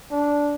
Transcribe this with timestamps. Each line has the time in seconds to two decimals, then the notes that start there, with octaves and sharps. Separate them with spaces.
0.11 D4